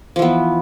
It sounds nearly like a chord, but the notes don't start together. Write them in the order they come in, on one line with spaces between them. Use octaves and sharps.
F3 E3 B3